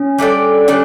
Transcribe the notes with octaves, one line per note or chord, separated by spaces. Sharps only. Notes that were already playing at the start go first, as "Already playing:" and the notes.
Already playing: C#4
G3 D4 A4 D5
G3 C#4 D4 A4